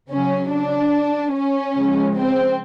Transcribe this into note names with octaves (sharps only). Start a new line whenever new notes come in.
C#3 F#3 C#4
D4
C#4
C#3 F3 G#3
C4